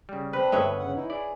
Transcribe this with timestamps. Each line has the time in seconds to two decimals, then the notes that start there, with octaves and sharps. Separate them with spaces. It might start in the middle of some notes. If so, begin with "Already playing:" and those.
0.09 C#3 G3
0.33 C4 D4 B4 C5
0.52 G1 G2 B4 C#5 D#5 E5
0.78 E2 C#3 F#5
0.93 E3 D#4 E4
1.10 E4 G#4 D5